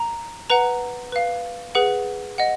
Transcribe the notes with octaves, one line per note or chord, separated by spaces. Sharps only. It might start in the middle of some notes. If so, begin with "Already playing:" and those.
Already playing: A#5
B4 F#5 A#5
B4 F5
G#4 B4 F#5
D#5 F#5